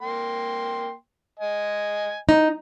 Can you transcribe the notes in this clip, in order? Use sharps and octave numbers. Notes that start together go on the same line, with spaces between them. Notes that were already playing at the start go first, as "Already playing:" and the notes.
A#3 G5 C6
D#5 G#5
D#4